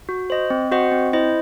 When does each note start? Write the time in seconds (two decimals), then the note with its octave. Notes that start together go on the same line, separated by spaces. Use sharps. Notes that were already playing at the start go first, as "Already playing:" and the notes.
0.09 F#4
0.30 C5 D#5
0.50 C4
0.72 F#4 C5 D#5 F#5
0.92 C4
1.13 E4 C5 D#5